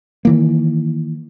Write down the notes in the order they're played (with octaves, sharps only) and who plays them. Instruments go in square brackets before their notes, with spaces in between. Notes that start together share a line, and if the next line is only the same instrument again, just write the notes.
[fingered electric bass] D#3 E3 A#3